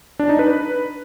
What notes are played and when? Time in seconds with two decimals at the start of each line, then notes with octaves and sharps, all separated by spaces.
0.19 D4
0.29 D#4
0.39 B4